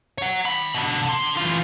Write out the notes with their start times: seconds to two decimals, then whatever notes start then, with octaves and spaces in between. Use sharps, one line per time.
0.18 C#5 F#5
0.45 D#3 B5
0.75 B2 D3
1.05 D3 C6
1.37 E3 F4